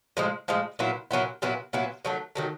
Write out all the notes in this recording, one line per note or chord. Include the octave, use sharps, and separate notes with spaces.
A2 F3 G#3
A2 F3 G#3
A#2 F#3 B3 E4
A#2 F#3 B3 E4
A#2 F#3 B3 E4
A#2 F#3 B3 E4
D#3 F#3 A3
D#3 F#3 A3